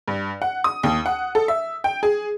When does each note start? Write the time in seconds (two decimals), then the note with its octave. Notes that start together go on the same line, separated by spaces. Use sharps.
0.08 G2
0.42 F#5
0.64 D#6
0.83 D#2
1.06 F#5
1.35 A4
1.48 E5
1.84 G5
2.03 G#4